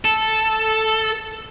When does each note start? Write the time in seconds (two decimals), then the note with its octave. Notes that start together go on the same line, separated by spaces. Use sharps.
0.05 A4